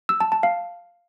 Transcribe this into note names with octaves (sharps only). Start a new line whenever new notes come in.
E6
A5
A5
F5